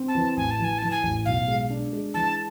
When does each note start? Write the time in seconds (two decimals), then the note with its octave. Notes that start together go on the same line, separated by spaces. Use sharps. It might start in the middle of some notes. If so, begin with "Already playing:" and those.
Already playing: C4
0.08 A5
0.15 E3
0.37 A1 G#5
0.51 A5
0.59 E3 G#5
0.78 E3 A5
0.91 G#5
1.03 A1
1.26 B1 F5
1.48 G#3
1.70 D4
1.93 G#3
2.14 E3 A5